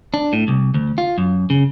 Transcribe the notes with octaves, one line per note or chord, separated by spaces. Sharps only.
D4
A2
C2
D2
F4
F#2
C#3